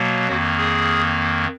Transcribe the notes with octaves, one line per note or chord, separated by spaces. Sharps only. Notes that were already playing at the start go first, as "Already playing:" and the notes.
Already playing: B2 F#3 A#3
F2 D#3 A#3 F#4
G#4